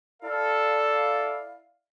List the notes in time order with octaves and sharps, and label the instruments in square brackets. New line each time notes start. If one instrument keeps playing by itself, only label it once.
[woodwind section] E4 D5 F5 [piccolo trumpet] A4